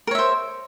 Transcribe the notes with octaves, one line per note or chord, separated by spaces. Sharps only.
A#4 C5 C#5 E5